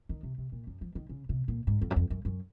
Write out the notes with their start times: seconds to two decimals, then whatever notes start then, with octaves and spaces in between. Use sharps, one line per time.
0.09 D#3
0.23 C3
0.38 C3
0.52 A#2
0.67 F#2
0.81 F3
0.95 D#3
1.09 C#3
1.29 C3
1.48 A#2
1.67 G#2
1.82 F2
1.91 F#2
1.96 F2
2.10 F#2
2.25 F#2